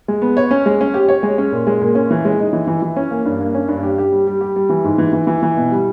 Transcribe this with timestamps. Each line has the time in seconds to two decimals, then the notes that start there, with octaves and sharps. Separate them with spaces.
0.08 G#3
0.22 B3
0.37 C#5
0.51 C#4
0.66 G#3
0.81 C#4
0.94 G4
1.09 C#5
1.23 G#3
1.38 C#4
1.52 A#2
1.67 G#3
1.81 A#2
1.95 C#4
2.11 E3
2.25 G#3
2.39 D#4
2.53 E3
2.67 E3
2.82 E3
2.96 C#4
3.11 A#3
3.25 G2
3.40 A#3
3.54 C#4
3.68 G2
3.83 G4
3.98 G4
4.12 G3
4.27 G3
4.41 G4
4.56 G3
4.69 E3
4.84 G#2
4.98 E3
5.13 E3
5.27 E3
5.43 E3
5.57 B2
5.71 G3